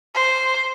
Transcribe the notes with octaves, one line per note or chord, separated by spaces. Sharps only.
C5